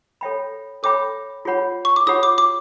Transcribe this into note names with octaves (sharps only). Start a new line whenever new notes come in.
A4 C#5 E5 G5 B5
A4 C#5 E5 G5 B5 D6
F4 G#4 C#5 F#5 B5
C#6
D6
F4 G#4 C#5 F#5 B5 D#6
D6
D6